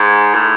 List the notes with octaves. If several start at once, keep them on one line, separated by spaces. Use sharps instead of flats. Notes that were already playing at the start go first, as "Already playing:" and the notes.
Already playing: G#2
A2